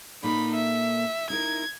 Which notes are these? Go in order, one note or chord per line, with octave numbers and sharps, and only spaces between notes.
A#2 A#3 D#4 A4 B5
E5
D#4 E4 A#4 G#6